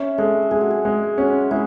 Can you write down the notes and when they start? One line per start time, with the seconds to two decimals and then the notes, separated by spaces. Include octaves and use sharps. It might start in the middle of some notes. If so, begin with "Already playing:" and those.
Already playing: C#4 E5
0.18 G#3 A4
0.51 G#3 G#4
0.61 F#4
0.70 G#4
0.85 G#3
1.18 C#4 F#4
1.51 G#3 E4